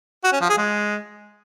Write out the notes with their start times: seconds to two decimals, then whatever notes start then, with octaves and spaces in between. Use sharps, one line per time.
0.24 F#4
0.32 C#4
0.41 F3
0.49 G#4
0.58 G#3